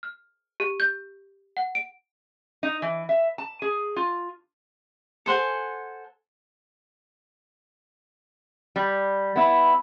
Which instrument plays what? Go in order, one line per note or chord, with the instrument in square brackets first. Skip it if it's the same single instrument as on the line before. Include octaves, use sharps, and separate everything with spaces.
[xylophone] F6
G4
G6
F#5
D7
[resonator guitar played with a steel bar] D#4
E3
E5
A5
G#4
F4
[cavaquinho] A4 C5 F#5 G#5
[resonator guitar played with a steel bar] G3
B3 E4